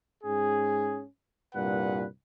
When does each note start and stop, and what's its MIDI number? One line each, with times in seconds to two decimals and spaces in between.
0.23 1.03 44
0.23 1.03 61
0.23 1.03 68
1.54 2.05 36
1.54 2.05 43
1.54 2.05 46
1.54 2.05 71
1.54 2.05 78